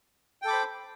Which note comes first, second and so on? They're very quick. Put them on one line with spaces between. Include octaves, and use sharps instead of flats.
G5 A4 D6 B5 C5